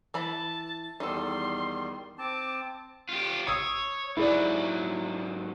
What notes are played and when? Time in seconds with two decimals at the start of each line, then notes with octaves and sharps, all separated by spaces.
0.14 E3 A5 B5
1.00 E2 D#3 G3 D#4 A4 C6
2.18 C4 A5 D6
3.09 F4 G4
3.47 C#5 D#6 E6
4.17 G#2 F#3 E4 G#4 D5